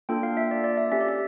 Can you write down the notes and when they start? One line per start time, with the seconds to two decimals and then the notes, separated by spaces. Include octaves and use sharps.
0.09 A#3 D4 F4 A4 G5
0.23 F5
0.37 E5
0.51 D5
0.64 D5
0.77 E5
0.91 C#4 G4 E5
1.01 D5
1.09 E5